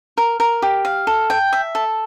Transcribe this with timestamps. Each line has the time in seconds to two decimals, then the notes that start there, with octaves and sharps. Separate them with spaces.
0.18 A#4
0.40 A#4
0.62 G4
0.85 F5
1.07 A4
1.30 G5
1.53 E5
1.75 A4